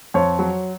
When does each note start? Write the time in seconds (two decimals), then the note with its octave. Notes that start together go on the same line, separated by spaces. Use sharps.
0.14 F2 C#5
0.39 F#3